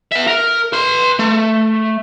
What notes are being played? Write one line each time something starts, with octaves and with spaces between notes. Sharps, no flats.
B3 E5
A#4
B4 C6
A3